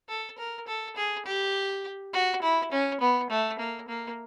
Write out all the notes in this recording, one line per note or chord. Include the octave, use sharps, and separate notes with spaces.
A4
A#4
A4
G#4
G4
F#4
E4
C#4
B3
A3
A#3
A#3